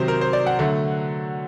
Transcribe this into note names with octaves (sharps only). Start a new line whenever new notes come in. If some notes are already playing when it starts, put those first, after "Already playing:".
Already playing: C3 D#3 F#3 C5
A#4
C5
D5
F#5
D3 F#3 A3